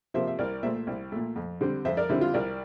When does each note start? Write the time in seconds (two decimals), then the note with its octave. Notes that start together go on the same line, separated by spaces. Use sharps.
0.14 C3 F3 A#3 C5 E5
0.28 E5
0.39 C2 A#4 D5
0.63 A#2 A3 C5 E5
0.87 C2
1.12 A#2 A3
1.36 F2
1.61 D3 G3 C4
1.85 F2 C5 E5
1.97 A#4 D5
2.09 D3 G3 C4 E4
2.21 F4
2.34 C2 A#4 D5